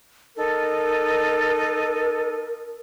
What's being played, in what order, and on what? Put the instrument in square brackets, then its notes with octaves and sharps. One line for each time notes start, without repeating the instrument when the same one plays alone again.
[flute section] D#4 A4 [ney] A#4